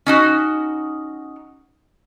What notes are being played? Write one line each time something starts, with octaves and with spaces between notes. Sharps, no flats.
C#4 D#4 F#4